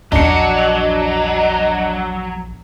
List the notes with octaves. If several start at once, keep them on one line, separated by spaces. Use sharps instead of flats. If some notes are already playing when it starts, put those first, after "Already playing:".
A#1 E2 F#3 D4 D#5 C#7